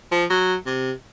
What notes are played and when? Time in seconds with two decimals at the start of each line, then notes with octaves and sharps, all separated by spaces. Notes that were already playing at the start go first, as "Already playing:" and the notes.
0.12 F3
0.30 F#3
0.66 C3